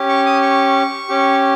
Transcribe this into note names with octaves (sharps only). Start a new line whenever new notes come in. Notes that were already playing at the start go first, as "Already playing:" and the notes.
Already playing: C#4 G4
C#6
D#6
C#6
C#4 G4